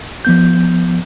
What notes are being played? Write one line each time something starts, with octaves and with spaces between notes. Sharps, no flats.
F3 B3 G6